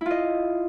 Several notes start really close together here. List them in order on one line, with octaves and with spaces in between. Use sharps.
E4 F4 D#5